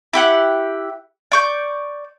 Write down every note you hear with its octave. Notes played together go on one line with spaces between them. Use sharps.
E4 G4 F#5
D5 C#6 G6